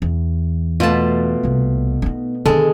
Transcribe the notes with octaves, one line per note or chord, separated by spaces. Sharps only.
E2
B2 A3 F4 A5
C2 A#3
B3 D#4
D3 D#3 G#3 A4